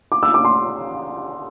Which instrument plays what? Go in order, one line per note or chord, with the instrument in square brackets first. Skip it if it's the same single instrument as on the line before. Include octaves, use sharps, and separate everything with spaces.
[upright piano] D6
E6
D6
C6